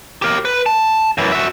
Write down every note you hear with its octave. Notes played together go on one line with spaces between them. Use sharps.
G4 A#4
B4
A5
F#2 E3
F#4 E5